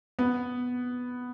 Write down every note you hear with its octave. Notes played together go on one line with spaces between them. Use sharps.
B3